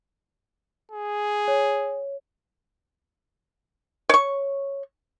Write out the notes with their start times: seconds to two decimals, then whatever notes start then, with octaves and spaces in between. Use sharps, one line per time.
0.92 G#4
1.48 C#5
4.09 C#5 C#6